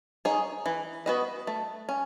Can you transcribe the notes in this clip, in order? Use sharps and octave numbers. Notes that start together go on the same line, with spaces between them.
D#4 G#4 C#5
E3
B3 F#4 B4 D#5
A3
C#4